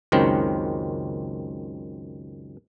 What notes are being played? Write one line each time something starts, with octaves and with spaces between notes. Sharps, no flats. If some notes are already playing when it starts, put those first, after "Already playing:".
C#2 F#2 D#3 C4